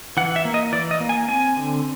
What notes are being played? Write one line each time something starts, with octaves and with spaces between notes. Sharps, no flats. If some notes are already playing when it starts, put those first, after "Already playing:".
E3 F#5
E5
A#3
D#5
E3 D5
D#5
A#3
G#5
C4 G#5
D3